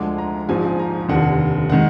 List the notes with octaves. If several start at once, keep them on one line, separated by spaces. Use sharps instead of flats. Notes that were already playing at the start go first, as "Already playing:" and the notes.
Already playing: D2 D3 F3 G#3 D6
A#5
A#1 G#2 F3 G#5
A#5
F1 D#2 D3 F#5
D#3 G#3 F#5